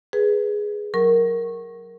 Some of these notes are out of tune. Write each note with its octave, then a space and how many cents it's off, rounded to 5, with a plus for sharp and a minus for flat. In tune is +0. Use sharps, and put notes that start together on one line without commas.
G#4 +0 B4 -5
F#3 +5 A#4 +0 C#6 -20